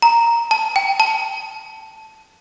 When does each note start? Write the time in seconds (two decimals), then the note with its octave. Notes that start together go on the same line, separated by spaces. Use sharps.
0.02 A#5
0.51 A5
0.76 G5
1.00 A5